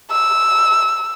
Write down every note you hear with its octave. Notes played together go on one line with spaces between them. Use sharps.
E6